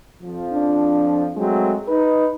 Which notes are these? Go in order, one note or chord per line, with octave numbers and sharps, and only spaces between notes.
F2 F3
D4
F#3 G#3 A3 C4
D#4 B4